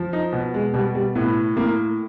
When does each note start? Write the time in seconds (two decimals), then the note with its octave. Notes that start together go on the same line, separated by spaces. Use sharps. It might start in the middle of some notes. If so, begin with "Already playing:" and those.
Already playing: F3
0.13 D#4
0.33 B2
0.54 G#3
0.74 B2 G3
0.95 G3
1.15 A2 B3
1.56 A2 A#3